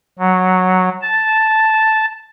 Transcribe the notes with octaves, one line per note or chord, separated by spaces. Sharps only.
F#3
A5